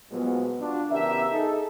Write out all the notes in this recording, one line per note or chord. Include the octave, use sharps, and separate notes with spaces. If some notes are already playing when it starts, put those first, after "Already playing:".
A#2 F3 F#3 G#3 B3
D4 F4 F#4
C#3 E3 B3 G4 A#4 E5
D#4 G#4 A4